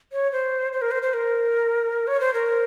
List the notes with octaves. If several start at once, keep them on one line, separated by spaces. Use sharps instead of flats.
C#5
C5
C5
A#4
C5
C5
A#4
C#5
C5
A#4